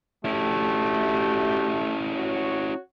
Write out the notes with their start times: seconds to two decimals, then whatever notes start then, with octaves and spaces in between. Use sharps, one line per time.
0.25 A3 C#4 D4 E4 F#4 G4
2.11 F#4 C#5